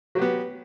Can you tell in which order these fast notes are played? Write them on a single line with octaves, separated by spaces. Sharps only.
F#3 G4 B3